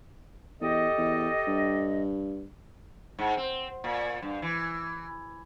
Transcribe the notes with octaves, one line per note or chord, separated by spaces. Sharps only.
E2 G4 A4 D#5
E2
G2
G#2
C4
A#2
G2
E3